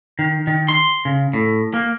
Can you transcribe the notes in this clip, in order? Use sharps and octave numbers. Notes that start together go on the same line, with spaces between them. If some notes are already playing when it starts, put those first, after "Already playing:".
D#3
D#3
C6
C#3
A2
A#3